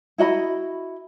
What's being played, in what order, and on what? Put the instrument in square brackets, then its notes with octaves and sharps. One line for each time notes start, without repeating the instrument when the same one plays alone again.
[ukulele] E4 F#4 D#5 B5